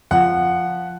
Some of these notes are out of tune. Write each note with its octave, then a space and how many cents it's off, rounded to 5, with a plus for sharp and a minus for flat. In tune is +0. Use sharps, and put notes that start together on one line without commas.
F3 +0 F#5 +0